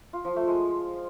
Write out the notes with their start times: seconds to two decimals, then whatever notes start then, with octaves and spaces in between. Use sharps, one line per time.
0.13 F4
0.25 F3
0.36 A3
0.48 G#3